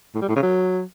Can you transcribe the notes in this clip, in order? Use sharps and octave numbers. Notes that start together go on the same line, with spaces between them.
A2
G3
A2
C#3
F#3